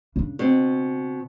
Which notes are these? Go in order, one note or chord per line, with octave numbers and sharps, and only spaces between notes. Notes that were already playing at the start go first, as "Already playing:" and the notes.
C#3 D4
B2 C4